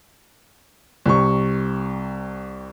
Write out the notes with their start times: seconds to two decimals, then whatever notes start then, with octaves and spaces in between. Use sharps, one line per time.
1.06 C2 C3 C#6